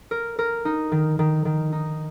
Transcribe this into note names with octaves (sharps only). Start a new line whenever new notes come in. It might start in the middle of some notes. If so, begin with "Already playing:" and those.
A#4
A#4
D#4
D#3
D#3
D#3
D#4